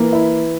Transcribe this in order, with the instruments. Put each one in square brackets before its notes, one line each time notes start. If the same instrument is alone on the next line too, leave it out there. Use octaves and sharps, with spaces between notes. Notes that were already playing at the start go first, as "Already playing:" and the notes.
Already playing: [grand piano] E3 [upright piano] A#3
[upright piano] E4